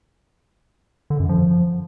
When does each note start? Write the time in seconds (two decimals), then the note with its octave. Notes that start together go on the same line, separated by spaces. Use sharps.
1.10 D3
1.20 F#2
1.29 F3